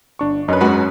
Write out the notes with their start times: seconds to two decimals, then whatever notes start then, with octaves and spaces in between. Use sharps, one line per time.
0.19 G1 D4 C#6
0.48 F#2 C#4 D#4 B4
0.61 G#2 F#4 B4